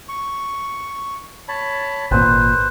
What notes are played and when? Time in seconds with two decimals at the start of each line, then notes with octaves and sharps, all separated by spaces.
0.09 C#6
1.48 C#5 A5 B5
2.11 G#1 A#2 B4 C5